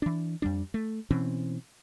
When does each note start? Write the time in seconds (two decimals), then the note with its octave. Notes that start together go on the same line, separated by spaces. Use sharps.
0.02 E3 D4
0.42 F2 G3 D4
0.74 A3
1.11 B2 E3 C4 C#4